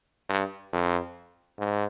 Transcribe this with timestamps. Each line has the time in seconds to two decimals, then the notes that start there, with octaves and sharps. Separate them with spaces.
0.30 G2
0.73 F2
1.59 G#2